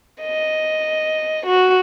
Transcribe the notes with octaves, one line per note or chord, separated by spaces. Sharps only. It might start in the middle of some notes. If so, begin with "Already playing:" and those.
D#5
F#4